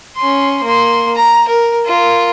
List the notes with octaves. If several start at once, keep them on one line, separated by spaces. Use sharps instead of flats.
C#4 C6
A#3 C6
A#5
A#4
F4 A#4